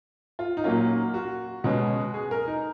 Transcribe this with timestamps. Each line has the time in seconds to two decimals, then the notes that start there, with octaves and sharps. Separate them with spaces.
0.39 F4
0.57 D#4
0.64 A#2 F#3 A#3 C#4 F4
1.14 F#4
1.64 B2 G#3 C#4
2.14 G#4
2.31 A#4
2.47 D#4